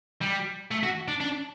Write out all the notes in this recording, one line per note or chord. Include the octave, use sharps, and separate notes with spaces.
G3
A3
F#4
D4
D4